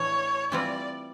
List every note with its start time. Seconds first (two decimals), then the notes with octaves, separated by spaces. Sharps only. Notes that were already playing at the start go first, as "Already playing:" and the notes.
Already playing: A2 E3 A3 D4 C#5
0.52 E3 G3 C4 F4 D5